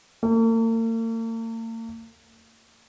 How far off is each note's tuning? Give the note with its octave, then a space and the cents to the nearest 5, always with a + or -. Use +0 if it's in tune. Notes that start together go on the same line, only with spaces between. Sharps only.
A#3 -45